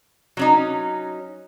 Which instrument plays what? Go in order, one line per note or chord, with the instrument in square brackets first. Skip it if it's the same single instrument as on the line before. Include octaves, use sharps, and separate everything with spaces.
[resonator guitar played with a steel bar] F#3 C#4 D#4